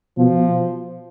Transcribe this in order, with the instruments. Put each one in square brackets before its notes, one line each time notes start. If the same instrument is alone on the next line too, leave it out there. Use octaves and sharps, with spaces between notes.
[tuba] B2 [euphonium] F3